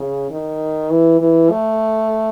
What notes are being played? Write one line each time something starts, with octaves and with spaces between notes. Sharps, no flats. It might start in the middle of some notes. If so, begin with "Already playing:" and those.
Already playing: C#3
D#3
E3
E3
A3